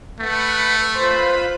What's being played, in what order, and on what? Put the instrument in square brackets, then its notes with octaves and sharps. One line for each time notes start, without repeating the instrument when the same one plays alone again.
[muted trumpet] A3 [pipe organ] B4 F#5
[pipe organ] F4 B4 B5 [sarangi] C5